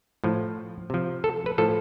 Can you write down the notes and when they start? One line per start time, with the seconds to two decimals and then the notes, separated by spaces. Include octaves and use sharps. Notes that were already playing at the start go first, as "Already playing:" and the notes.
0.24 A2 F3
0.90 C3 F3
1.24 A4
1.46 B4
1.58 A2 F3 A4